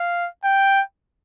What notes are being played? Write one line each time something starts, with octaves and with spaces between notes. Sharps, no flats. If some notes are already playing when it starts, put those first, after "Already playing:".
Already playing: F5
G5